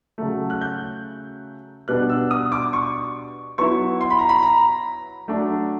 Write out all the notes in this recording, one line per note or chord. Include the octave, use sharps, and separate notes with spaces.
C#3 F#3 A3
F#6
G6
B2 G3 B3 D4 F#6
E6
D#6
D6
C#6
F#3 B3 E4 C#6
C6
B5
A#5
B5
A#5
F#3 A3 D4